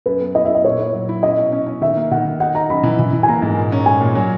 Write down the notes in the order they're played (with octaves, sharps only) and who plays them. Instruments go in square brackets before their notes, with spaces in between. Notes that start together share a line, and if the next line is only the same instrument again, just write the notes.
[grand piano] F#2 [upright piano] B4
[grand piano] B3
[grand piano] E4 [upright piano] D#5
[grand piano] E4 [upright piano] E5
[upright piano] D#5
[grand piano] A#2 [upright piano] C#5
[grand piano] E4
F#3
E4
[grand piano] C#4 [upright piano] D#5
[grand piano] B2
C#4
C#4
[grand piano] D#3 [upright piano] E5
[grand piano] A#3
[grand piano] D#3 [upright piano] F#5
[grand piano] D#3
[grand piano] D#4 [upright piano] F#5
[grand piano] D#4 [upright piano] A#5
[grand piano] F#2 [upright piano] B5
[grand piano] E3
E3
E3
[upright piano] G#5
[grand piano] A#3 [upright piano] A#5
[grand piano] G#2
A#2
C#4
[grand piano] G#3 [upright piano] G#5
[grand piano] A#2
F#3